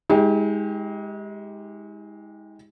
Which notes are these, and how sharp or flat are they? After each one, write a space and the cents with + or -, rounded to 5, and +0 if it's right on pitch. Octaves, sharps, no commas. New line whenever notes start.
G#3 -5 D#4 +45 G4 +5